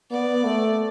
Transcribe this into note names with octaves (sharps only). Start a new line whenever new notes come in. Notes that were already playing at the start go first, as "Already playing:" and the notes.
B3 D5
A3